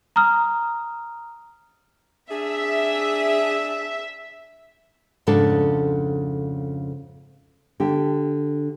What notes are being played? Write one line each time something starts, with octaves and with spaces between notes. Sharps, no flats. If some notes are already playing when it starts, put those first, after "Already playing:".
A#5 D#6 F6
D4 G#4 E5
F2 G#2 C#3 D4 A4
D3 G4